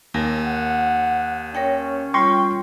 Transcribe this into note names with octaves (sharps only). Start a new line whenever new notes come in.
D#2 A#4 G#5
F#5
C#4 A#4 C#5 G5
G3 F4 G5 C6 C#6